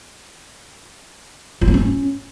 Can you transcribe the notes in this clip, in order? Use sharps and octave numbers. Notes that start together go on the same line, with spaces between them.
F4
B3
C#4